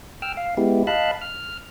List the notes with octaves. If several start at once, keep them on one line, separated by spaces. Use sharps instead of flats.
G5 E6 F6
F5
G#3 B3 E4 G4
D#5 F5 A5 B5 F#6
F6